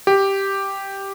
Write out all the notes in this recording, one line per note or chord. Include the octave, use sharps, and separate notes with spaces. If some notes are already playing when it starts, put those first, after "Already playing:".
G4